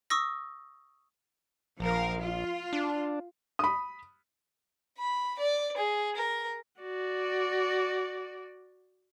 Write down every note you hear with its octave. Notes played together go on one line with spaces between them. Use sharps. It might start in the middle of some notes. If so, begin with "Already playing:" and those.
C#6 D#6 E6 A#6
A#1 F3 A#4 F5
F4
D4
B5 D#6
B5
D5
G#4
A#4
F#4 D5